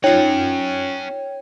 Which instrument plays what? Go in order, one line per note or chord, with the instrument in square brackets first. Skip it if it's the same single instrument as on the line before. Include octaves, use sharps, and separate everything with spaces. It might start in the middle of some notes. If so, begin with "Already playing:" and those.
[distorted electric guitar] C#4 F#5 [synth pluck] D#4 F4 [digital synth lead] C#5 [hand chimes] G5